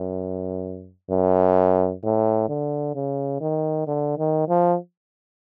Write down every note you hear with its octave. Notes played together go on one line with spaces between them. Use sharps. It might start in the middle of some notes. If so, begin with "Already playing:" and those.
Already playing: F#2
F#2
A2
D3
C#3
D#3
D3
D#3
F3